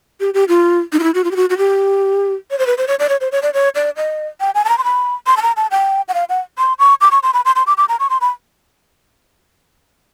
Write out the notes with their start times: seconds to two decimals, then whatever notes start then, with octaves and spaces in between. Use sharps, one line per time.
0.20 G4
0.34 G4
0.48 F4
0.93 D#4
0.99 F4
1.03 E4
1.14 F#4
1.24 F4
1.31 G4
1.36 F#4
1.50 F#4
1.58 G4
2.51 C#5
2.59 C5
2.67 B4
2.78 C5
2.88 C#5
2.99 D5
3.09 C#5
3.21 C5
3.32 C#5
3.42 D5
3.54 C#5
3.75 D5
3.97 D#5
4.40 G5
4.55 G#5
4.65 A5
4.69 A#5
4.78 C6
4.84 B5
5.27 C6
5.37 A5
5.42 A#5
5.57 A5
5.71 G5
6.08 F#5
6.14 F5
6.29 F#5
6.58 C6
6.79 C#6
7.01 D6
7.12 C#6
7.23 C6
7.34 B5
7.45 C6
7.56 C6
7.67 D6
7.77 D6
7.89 A#5
8.00 C#6
8.10 C6
8.21 B5